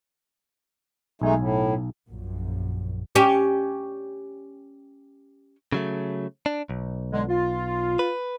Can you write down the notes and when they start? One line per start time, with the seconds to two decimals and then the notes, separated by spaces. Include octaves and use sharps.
1.22 B1 G#3 A3 D#4 G#5
1.38 A2
2.10 A#1 F#2
3.15 C#4 G4
5.72 C#3 F#3 A3
6.46 D4
6.69 B1
7.12 D3 G#3
7.28 F4
7.99 B4